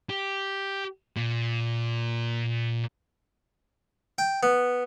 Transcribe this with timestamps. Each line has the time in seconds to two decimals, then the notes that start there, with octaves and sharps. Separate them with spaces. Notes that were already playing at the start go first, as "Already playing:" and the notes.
0.10 G4
1.16 A#2
4.18 G5
4.43 B3